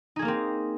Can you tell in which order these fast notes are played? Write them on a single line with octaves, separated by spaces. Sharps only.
D#4 G#4 A#3 A#4 C4